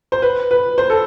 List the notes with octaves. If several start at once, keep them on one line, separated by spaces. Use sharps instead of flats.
C5
B4
B4
C5
A4